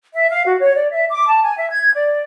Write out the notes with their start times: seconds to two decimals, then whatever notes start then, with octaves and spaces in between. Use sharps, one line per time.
0.13 E5
0.30 F5
0.45 F#4
0.59 C#5
0.75 D5
0.91 E5
1.10 D6
1.28 A5
1.43 G#5
1.57 E5
1.70 G#6
1.94 D5